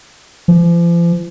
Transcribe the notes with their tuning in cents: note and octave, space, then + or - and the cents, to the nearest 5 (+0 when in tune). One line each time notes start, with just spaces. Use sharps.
F3 -40